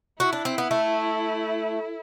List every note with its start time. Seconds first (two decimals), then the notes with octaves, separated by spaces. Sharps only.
0.19 E4 F#4
0.33 D4
0.45 C4
0.58 B3
0.71 A3